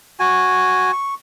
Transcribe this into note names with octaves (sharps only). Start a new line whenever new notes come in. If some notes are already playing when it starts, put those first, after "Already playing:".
F#4 G#5
C#6